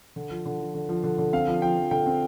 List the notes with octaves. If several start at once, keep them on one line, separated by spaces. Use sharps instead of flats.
D3
F3
D3
F3
D3
F3
D3
D3
C4 F5
F3
F3 G5
F3
D3 G5
C4